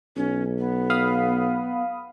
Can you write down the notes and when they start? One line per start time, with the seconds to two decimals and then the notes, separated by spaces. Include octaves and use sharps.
0.16 B1 C#4
0.59 B3
0.90 F5 B5 D#6